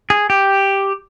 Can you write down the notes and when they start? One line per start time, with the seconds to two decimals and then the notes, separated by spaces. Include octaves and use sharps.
0.10 G#4
0.30 G4